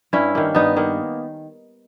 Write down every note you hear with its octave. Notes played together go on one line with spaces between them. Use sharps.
G2 C#4 E4
D#3 A#3
G2 B3 D#4
D#3 A#3